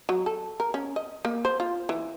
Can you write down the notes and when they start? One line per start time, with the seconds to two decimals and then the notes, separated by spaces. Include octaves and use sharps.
0.09 F#3
0.26 A4
0.60 A#4
0.74 C#4
0.96 D#5
1.25 A#3
1.45 C5
1.60 F4
1.89 E3